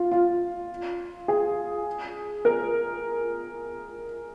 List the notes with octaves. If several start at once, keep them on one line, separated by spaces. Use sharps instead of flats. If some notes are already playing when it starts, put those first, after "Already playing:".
Already playing: F4
F4
G#4
A#4